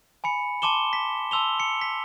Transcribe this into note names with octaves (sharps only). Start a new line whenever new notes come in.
G#5 B5 C#7
A5 C6 D6 E7 G7
B6
A5 C6 E6 F7 G7
C#7
B6